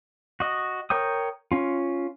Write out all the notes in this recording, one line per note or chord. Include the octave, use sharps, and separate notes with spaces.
F#4 D#5
A#4 C#5 G5 D#6
C#4 F4